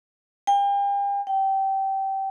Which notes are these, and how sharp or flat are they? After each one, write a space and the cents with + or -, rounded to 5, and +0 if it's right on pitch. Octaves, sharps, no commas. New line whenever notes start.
G5 +40
G5 -20